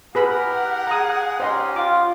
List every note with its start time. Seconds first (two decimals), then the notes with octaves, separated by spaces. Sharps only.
0.15 E4 G4 G#4 A#4 B4 F#5 B5
0.87 G#4 A#5 D#6
1.40 C#4 D#4 G4 C5 D#5 C6
1.76 F4 D6